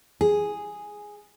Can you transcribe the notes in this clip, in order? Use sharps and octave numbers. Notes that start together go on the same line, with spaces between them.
G#4